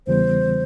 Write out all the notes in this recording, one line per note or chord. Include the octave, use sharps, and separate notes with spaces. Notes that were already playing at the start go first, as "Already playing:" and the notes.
E2 C#3 E3 G3 B3 C5